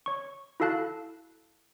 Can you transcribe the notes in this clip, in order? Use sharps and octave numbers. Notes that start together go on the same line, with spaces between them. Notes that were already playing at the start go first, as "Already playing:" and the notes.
C#5 C#6
E4 F#4 A4 F5 A5 F#6